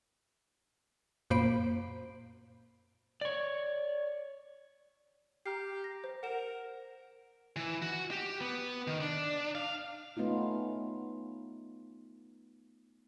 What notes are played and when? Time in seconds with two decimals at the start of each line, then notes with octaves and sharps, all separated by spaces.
1.30 F#2 A#2 A#3 C5 B5 D7
3.21 C#5 D5
5.46 G4 A#5 F6 C7
5.84 A#6
6.04 C5
6.23 A#4 F#5 E7
7.56 E3
7.82 F#4
8.11 G4
8.41 B3
8.87 D#3
9.01 D4
9.55 F5
10.17 A3 B3 C#4 D#4 F4